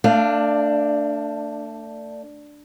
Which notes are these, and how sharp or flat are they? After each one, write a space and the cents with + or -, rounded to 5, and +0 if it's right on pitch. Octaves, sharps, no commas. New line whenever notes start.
A3 +30 D4 +0 F5 -5